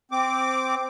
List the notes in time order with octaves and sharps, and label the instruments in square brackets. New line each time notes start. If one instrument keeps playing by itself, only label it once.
[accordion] C4 D6